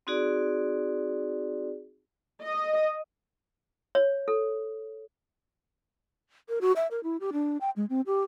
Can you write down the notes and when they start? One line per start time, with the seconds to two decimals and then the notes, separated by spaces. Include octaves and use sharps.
0.07 C4 D#4 F#4 G#4 D5
2.42 D#5
3.95 C#5
4.28 A4
6.49 A#4
6.61 F#4
6.76 E5
6.91 A#4
7.04 E4
7.20 G4
7.33 D4
7.61 G5
7.76 G#3
7.90 C4
8.06 G4